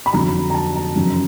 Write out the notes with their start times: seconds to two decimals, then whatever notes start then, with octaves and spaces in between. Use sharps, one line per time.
0.06 B5
0.13 F2 D3 F#3 A#5
0.50 A#5
0.54 A5
0.76 A#5
0.96 F#2 C#3 F3